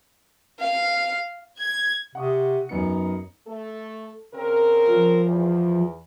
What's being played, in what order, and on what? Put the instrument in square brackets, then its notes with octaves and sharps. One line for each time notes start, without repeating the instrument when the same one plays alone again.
[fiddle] F5
[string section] G#6
[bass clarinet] C3 [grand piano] F#5 C#6 D#6
[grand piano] F#2 B3 C#7 [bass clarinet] D#4
[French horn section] A3 A4
C#3 C4 A#4
[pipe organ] F3
[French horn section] E2